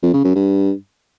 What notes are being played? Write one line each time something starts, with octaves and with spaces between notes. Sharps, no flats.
F2
C#3
F#2
G2